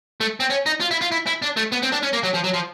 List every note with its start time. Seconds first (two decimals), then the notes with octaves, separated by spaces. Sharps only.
0.21 A3
0.40 C4
0.50 C#4
0.66 D#4
0.80 F4
0.91 E4
1.01 F4
1.11 E4
1.27 E4
1.42 D4
1.57 A3
1.73 B3
1.83 C4
1.93 D4
2.03 C#4
2.13 A#3
2.23 F#3
2.34 F3
2.44 F#3
2.54 F3